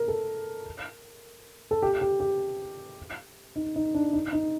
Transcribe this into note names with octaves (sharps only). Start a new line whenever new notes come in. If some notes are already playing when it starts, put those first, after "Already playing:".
Already playing: A#4
A4
A4
G4
G4
G4
D#4
D#4
D4
D#4
D#4